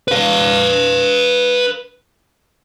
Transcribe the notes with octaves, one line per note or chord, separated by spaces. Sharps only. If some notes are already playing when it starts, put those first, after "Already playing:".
B4 F5